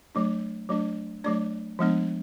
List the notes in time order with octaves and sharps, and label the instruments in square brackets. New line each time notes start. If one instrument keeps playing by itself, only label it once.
[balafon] F#3 A3 D4
F#3 A3 D4
F#3 A3 D4 D5
F3 G#3 B3 D4